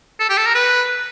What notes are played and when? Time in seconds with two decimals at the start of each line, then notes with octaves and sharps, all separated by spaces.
0.20 A4
0.29 G4
0.37 A4
0.47 A#4
0.55 B4